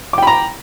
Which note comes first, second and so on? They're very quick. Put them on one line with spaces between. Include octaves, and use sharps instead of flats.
D6 G5 B5 A#5